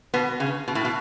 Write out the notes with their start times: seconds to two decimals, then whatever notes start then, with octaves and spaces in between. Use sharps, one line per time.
0.14 B2 B3
0.40 C#3
0.68 B2
0.75 A2
0.85 B2